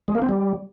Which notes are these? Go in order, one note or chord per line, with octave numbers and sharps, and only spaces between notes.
G#3
A#3
C4
G3